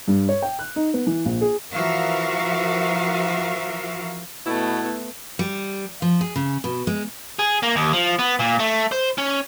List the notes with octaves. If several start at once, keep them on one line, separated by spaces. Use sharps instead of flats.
G2
C#5
G5
F#6
D#4
B3
E3
A#1
G#4
E3 F3 F#4 A#4 E5 F5
B2 A3 B3 E4
G3
F3
G#4
C#3
B2
G#3
G#4
A#3
D#2
F3
B3
A#2
A3
C5
C#4